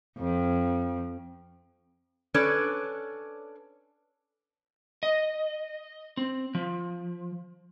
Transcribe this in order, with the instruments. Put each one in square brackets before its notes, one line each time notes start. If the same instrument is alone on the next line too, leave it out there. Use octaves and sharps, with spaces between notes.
[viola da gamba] F2
[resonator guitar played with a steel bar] C#4 D4 A4 B4 C#5 D5
[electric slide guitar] D#5
C4
F3